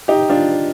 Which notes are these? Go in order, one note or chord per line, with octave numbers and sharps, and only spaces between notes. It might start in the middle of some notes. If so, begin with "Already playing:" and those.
D#4 G4
D4 F4